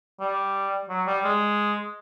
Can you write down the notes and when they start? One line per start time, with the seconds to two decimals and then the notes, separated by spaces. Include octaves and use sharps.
0.20 G3
0.89 F#3
1.07 G3
1.24 G#3